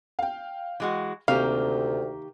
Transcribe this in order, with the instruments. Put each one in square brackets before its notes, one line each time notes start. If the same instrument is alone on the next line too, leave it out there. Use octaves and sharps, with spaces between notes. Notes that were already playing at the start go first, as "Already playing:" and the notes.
[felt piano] F5 G5
[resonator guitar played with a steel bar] E3 G#3 F#4
[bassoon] D2 [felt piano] C3 [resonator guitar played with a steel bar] D#3 A#3 G4 [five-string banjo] F5